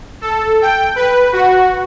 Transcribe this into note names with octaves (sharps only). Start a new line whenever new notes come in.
A4
G5
B4
F#4